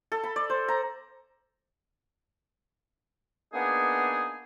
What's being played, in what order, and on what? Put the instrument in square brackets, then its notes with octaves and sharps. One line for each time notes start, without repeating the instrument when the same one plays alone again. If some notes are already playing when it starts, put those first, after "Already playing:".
[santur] A4
B5
D5
C5
A#5
[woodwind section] A#3 B3 D4 D#4 G#4